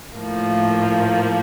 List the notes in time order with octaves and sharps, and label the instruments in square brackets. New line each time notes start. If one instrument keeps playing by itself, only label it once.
[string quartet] A2 F3 A#3